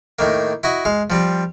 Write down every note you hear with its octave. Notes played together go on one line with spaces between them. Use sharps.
A2 D#3 A#3
E4 F#4 D#5
G#3 F5
F3 G3 C4